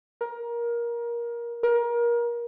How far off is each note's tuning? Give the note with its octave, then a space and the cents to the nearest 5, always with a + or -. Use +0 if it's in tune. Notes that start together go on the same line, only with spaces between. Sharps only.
A#4 +20
A#4 +25